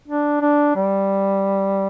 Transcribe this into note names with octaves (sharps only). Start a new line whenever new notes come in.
D4
D4
G3